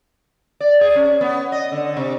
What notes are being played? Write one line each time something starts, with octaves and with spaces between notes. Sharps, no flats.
D5
G#4
C#4
B3
D#5
D3
C3